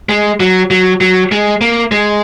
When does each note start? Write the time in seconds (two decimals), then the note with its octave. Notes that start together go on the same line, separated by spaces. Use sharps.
0.09 G#3
0.40 F#3
0.71 F#3
1.01 F#3
1.32 G#3
1.61 A#3
1.92 G#3